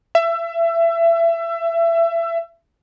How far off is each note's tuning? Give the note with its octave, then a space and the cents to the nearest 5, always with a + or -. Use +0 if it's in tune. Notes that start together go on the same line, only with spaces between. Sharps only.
E5 +25